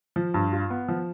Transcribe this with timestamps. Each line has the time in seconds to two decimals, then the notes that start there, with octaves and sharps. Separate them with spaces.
0.16 F3
0.34 G2
0.52 F4
0.70 B3
0.88 F3